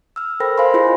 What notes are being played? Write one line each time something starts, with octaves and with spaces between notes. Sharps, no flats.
E6 F6
A4 A#4 C5 G5 B5 A#6
C5 F5 G#5 B5 C6
E4 F4 G#4 D#5 B5